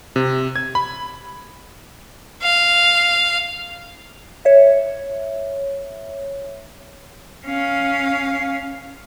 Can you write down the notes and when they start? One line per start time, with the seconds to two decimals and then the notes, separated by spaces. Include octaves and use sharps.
0.16 C3
0.56 G#6
0.75 B5
2.43 F5
4.45 C#5 E5
7.46 C#4 F5